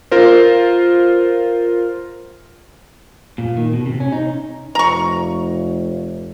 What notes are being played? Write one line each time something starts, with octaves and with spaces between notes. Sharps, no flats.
F4 A#4 C5
A#2
D#3
B2
C3
C#4
D#4
F1 A#5 C#6